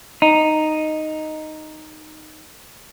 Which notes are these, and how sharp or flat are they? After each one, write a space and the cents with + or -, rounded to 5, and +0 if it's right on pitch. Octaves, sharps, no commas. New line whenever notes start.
D#4 -5